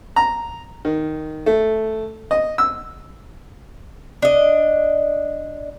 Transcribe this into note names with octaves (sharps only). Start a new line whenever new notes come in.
A#5
D#3
A3
D#5
E6
D4 D#5